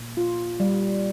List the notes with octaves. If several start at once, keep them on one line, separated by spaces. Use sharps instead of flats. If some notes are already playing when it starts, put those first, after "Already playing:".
Already playing: A#2
F4
G3